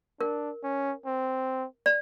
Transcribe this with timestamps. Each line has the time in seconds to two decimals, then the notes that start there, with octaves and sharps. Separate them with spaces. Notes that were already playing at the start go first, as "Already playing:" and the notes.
0.20 D4 A#4
0.63 C#4
1.06 C4
1.86 D5